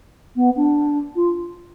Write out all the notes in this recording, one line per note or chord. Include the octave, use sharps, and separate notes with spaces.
B3
D4
F4